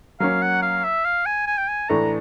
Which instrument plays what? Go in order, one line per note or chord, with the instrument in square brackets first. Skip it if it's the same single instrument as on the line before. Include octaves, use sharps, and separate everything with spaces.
[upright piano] F#3 A#3 C#4 [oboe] F5
[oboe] F#5
F5
E5
F5
G#5
G#5
G5
G#5
[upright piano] A2 E3 A3 D4 [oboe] A#5